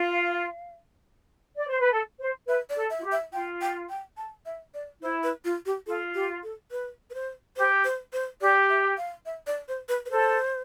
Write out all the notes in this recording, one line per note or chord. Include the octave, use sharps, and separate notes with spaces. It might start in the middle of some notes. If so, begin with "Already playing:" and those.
Already playing: F4 F5
D5
C5
B4
A4
C5
B4 E5
D5
A4
E5
F4
G4
E5
F4 G5
G5
G5
A5
E5
D5
E4 C5
B4
F4
G4
F4 A4
G4
A4
B4
B4
C5
G4 C5
C5
C5
G4 D5
E5
F5
E5
D5
C5
B4
B4
A4 C5